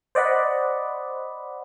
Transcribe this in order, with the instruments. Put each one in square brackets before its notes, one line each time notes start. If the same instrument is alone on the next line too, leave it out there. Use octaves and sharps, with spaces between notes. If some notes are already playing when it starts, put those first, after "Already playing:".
[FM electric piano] C5 D5 D#5 F#5 B5